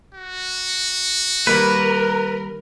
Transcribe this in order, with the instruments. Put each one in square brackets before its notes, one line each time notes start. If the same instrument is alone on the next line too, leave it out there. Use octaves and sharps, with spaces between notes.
[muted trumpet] F#4
[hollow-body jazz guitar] D#3 G3 A#3 [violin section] A#4 [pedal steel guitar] B4